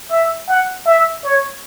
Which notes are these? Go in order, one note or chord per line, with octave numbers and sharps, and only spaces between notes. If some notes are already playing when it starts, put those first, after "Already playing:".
E5
F#5
E5
C#5